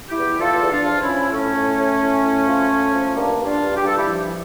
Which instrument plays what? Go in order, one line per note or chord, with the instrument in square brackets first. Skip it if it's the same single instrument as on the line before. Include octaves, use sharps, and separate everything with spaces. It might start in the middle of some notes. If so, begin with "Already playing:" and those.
[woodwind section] E4 G4
E2
E2 F4 A4
E2
D4 F4
F3
C#4 E4
F3
A2 A3 C#4
A2
A2
A2
A2
F3
A2
F3
G2 A#3 D4
G2
D4 F4
G2
G4
G2 A4
E4 G4
F3